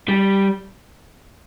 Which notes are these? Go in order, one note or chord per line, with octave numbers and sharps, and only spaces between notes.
G3